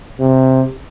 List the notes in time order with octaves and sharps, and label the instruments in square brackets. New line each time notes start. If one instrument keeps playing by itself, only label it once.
[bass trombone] C3